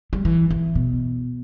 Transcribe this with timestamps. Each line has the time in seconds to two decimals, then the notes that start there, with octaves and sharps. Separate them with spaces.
0.13 G3
0.25 E3
0.51 E3
0.75 B2